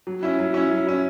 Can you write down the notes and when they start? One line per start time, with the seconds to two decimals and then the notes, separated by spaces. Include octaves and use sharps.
0.07 F#3
0.23 C#4 E4
0.39 F#3
0.54 C#4 E4
0.71 F#3
0.87 C#4 E4